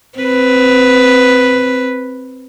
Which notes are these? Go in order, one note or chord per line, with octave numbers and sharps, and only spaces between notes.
C4 B4